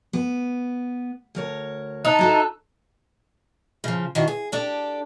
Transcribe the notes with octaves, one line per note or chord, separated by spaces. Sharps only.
B3
D2 A#4 C#5
D#4 A5 E6 F#6
E4 F#4 A4
C#3 F3
D#3 E3 D4 F#4
G#4
D4 G4 A4